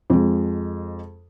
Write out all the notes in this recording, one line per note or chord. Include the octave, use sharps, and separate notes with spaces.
F2 G#3